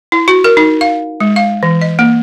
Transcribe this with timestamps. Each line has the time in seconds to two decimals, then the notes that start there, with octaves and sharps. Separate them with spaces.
0.12 E4
0.28 F#4
0.44 A#4
0.57 D#4
0.81 F5
1.20 G#3
1.36 F5
1.63 E3
1.81 D#5
1.99 A#3